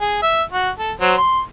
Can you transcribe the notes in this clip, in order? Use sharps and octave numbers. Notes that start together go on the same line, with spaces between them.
G#4
E5
F#4
A4
F#3 C5
C6